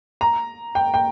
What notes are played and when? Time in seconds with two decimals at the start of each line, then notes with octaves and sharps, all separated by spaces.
0.21 A#5
0.75 G5
0.94 G5